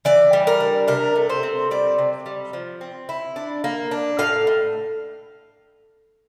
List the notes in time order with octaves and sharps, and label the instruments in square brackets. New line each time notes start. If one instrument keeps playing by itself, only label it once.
[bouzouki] E3 D5
G3
A#4
D4
C3 A#4
A3
C5
C4
G3 D5
C3
G3
F3
C4
E4
D4
A#3
D4
A2 F5
A2